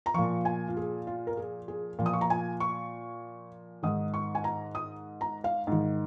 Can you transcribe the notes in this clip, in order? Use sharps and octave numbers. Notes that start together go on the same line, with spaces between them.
A#5
A#2 F3 C#6
G#5
F4
G#4
F4
A#4
G#4
G#4
A#2 F3
D#6
C#6
A#5
G#5
C#6
G#2 D#3 D#6
C#6
G#5
A#5
D#6
A#5
F5
G#2 D#3